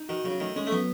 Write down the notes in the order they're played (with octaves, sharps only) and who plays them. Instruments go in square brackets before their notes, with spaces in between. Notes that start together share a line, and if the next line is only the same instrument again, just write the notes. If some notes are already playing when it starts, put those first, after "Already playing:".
Already playing: [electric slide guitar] D#4
[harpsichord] D#3 [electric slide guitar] F#4
[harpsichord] C#3 [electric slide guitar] F#3
[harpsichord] D#3 [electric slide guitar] A3
[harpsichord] G#3 [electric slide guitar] C#4
[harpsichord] A3
[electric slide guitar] F#3 [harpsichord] B3